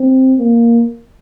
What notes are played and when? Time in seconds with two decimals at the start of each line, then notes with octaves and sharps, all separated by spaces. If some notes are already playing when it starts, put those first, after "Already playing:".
Already playing: C4
0.38 A#3